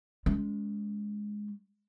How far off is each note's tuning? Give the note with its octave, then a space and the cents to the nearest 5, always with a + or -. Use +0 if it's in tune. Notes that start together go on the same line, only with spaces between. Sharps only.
G#3 +0 C#4 +30